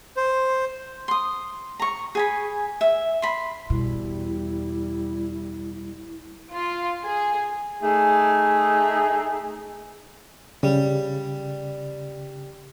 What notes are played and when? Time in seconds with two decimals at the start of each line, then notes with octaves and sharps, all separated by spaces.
0.17 C5
1.08 C6 D#6
1.79 A#5 C#6
2.15 G#4 G#5 B5
2.81 E5
3.22 B5 C6
3.70 E2 B2 G3 E4
6.52 F4
7.03 G#4
7.82 A3 D#4 G#4
10.63 C#3 G3